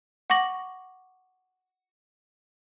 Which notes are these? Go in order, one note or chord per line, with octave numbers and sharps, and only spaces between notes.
F#5 C#6 D6 A#6 F#7